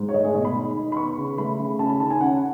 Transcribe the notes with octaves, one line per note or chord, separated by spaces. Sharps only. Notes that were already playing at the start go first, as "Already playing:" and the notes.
Already playing: G#2
C#5
A3 D#5
G#4
B2 D#5
B5
D#4
D#3
B5
B3 C#6
C#3
A3 B5
C#3
C#4 A5
B5
D#3 A5
G#5
C#4 F#5